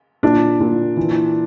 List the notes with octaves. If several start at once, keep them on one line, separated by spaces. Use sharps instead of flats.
A#2 D4
A#2
E3